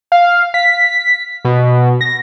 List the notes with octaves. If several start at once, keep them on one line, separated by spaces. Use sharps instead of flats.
F5
B6
B2
A#6